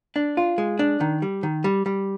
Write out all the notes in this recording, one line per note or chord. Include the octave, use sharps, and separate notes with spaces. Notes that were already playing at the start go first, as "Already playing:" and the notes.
D4
F4
G#3
D4
D#3
G3
D#3
G3
G3